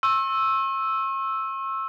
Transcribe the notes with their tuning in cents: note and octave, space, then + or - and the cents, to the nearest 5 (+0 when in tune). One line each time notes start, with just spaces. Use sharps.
C#6 -45 E6 +0